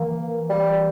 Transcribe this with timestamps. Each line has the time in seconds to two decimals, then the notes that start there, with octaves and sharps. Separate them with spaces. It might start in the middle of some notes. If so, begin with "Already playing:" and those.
Already playing: E3 A#3
0.49 G3